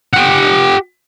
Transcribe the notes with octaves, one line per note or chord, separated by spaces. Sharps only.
G4 F#5